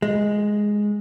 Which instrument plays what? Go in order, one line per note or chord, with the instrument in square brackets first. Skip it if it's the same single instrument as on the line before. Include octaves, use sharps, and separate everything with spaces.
[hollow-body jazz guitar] G#3